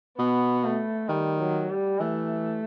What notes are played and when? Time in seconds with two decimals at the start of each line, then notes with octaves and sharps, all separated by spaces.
0.18 B2 B3
0.64 A3
1.09 D#3 G3
1.39 F#3
1.70 G3
2.00 E3 A3